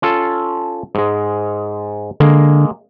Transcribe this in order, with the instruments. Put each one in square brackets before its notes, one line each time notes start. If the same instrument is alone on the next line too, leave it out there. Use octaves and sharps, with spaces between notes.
[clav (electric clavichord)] C#4 F4 A4
G#2 G#3
[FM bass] D3 [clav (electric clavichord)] G#3 A#3